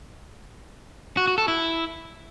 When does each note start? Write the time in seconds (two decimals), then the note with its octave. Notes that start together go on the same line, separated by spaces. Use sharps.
1.17 F#4
1.27 F#4
1.38 A4
1.48 E4